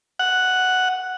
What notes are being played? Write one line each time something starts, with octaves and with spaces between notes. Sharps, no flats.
F#5